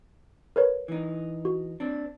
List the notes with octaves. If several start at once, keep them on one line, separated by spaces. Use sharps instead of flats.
A#4 B4 C#5
E3 D#4
F#4
C4 D4